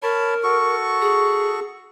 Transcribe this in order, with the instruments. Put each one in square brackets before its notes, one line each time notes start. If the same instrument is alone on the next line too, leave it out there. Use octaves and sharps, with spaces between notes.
[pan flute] A#4 [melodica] C#5 A5 B5
[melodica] F#4 A4 C#6
[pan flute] G#4